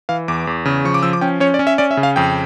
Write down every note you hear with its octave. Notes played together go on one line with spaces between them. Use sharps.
E3 F5
E2 D6
E2
C#3
F3 C#6
D6
F3 E6
D6
C#4 G5
C#4 C#5
D5
C#4
E5
C#4 D5
E5
C#3
F5
F2 G5